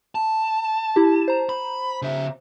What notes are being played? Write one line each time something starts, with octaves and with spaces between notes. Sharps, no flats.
A5
E4 G4
C5 A#5
B5
C#3 E5